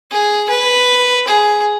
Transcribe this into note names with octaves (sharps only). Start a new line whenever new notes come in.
G#4
B4
G#4